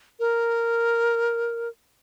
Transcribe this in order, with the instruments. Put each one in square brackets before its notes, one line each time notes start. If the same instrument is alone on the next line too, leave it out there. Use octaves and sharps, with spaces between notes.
[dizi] A#4